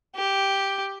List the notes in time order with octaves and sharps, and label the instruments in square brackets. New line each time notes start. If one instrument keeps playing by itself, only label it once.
[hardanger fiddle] G4